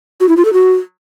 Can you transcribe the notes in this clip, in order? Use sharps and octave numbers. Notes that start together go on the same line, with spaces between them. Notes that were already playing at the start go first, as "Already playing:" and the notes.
F#4
E4
F4
A4
F#4